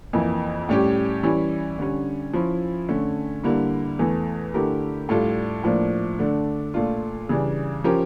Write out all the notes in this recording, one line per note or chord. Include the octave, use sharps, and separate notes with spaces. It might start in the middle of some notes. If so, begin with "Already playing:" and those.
F2 E3 A#3 E4
A2 G3 C#4 G4
E3 G3 C#4 E4
D3 G3 C#4
F3 C#4 E4
D3 A3 C#4
D3 G3 A#3 E4
E2 E3 A3
D3 A3 E4 G4 A#4
A2 G3 D4 F4 A4
A2 F3 A#3 D4
D3 A3 D4
A#2 A3 D4 F4
C#3 E3 G3 D4
F3 C#4 G4 A#4